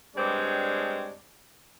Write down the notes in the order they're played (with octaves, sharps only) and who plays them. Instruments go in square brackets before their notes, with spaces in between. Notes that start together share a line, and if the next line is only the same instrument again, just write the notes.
[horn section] G2 G3 G#3 C4 D4 C#5